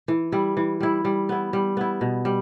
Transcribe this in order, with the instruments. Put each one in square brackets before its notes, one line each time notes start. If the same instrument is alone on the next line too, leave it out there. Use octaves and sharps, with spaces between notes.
[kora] E3
G3 E4
E3
G3 E4
G3
B3 E4
G3
B3 E4
B2
G3